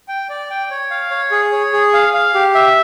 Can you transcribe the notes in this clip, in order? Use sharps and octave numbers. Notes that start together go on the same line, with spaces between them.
G5
D5
G5
C#5
F5
C#5
G#4
C#5
G#4
F5
F5
G4
E5